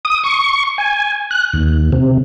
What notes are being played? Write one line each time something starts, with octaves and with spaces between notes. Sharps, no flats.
D#6
C#6
G#5
F#6
D#2
C3